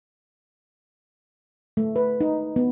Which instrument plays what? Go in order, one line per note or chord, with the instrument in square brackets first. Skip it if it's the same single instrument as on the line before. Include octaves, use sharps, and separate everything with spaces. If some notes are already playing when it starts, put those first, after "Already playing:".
[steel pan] A3
B4
D#4
B3